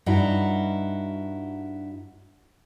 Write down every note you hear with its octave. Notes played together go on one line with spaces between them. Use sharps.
G2 D#4 E4 F#4 A#5